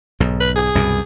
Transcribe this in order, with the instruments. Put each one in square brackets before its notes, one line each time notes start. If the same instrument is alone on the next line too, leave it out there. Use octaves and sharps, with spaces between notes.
[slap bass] B1 G#2
[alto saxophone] B4
G#4
[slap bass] C2 F#2 B2